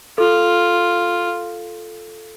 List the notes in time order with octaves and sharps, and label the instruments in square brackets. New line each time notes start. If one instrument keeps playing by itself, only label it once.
[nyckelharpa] F4 [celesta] A4